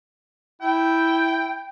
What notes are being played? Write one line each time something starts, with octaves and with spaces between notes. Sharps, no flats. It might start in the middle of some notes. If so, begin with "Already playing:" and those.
E4 G5